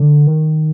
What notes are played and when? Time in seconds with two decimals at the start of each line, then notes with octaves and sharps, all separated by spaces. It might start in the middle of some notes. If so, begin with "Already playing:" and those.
Already playing: D3
0.27 D#3